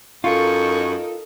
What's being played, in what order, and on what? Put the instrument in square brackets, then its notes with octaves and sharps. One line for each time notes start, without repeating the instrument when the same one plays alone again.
[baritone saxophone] F#2 [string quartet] D#4 A4 A#4 [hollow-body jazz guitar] F4 [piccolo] C#6